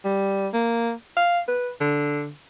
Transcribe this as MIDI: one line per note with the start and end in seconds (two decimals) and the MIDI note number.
0.05 0.49 55
0.53 0.92 58
1.17 1.40 77
1.48 1.70 71
1.80 2.30 50